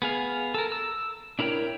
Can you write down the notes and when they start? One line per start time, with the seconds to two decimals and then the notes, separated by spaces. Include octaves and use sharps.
0.02 B3 G#4 F5
0.54 A4 A#4
0.72 E6
1.39 D4 E4 A#4 C#5 G5